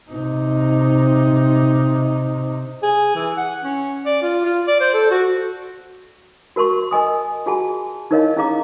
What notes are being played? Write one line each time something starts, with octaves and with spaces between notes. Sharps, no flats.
C3 D#4
G#4
E3
F#5
C#4
D5
F4
F4
D5
C5
A4
F#4
F#4 A#4 A5 C6 C#6
A#4 D#5 G#5 D#6
F4 F#4 G#4 F#5 G#5 A5
D#4 E4 A#4 C#5 D#5 F5
C#4 E4 G#4 F5 A#5 D6